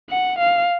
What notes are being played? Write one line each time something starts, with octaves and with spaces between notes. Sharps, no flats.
F#5
F5